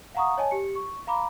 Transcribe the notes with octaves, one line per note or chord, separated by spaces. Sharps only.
F5 F#5 A#5 C#6 D#6
C#5 D#5 G#5 A5
G4 C#7
C#6
F5 A#5 B5 D6